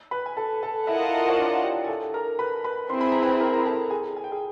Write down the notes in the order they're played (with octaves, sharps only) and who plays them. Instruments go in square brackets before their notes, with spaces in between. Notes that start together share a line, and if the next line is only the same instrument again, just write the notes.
[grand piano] B4 B5
G#5
A4 A5
A4 A5
[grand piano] E4 E5 [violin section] F4 A#4 D#5 F#5 A5
[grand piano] C#5
D4 D5
G4 G5
G#5
A4 A5
A#4 A#5
B4 B5
B4 B5
[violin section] C4 E4 G#4 [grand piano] C6
[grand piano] B5
A#5
B4 B5
A#4 A#5
A#5
A4 A5
G#4 G#5
G#5
G5
G#4 G#5